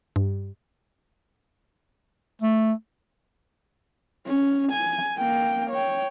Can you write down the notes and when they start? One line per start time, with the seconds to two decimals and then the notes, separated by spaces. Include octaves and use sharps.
0.16 G2
2.42 A3
4.26 C#4
4.72 G#5
5.18 A#3 G5
5.70 C#5 G5